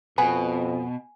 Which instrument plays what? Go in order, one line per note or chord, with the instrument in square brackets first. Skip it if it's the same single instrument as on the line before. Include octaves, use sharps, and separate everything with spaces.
[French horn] F2 [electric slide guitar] B2 [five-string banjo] B3 G#4 B4 [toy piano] G#5